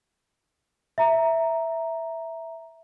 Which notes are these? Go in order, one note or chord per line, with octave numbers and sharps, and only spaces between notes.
E5 A#5